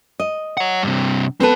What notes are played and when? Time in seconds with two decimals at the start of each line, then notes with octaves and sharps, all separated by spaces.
0.20 D#5
0.57 C#5 F#5
0.82 G2 C3
1.40 B3 C4 A4 B4 A5